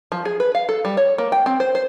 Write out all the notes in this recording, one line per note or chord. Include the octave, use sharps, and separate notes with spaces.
F3
G#4
B4
F5
A4
G3
C#5
A#3
G5
C4
C5
C5